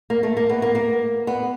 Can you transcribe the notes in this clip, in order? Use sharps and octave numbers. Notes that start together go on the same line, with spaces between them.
A#3
A3
A#3
B3
A#3
A#3
B3